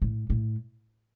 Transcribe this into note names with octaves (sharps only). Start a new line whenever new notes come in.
A2
A2